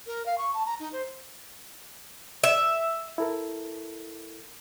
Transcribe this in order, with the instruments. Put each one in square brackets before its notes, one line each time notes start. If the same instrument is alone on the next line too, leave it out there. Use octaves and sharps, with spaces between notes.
[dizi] A#4
F5
C#6
A5
A#5
D#4
C5
[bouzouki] E5
[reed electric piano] E4 A4 A#4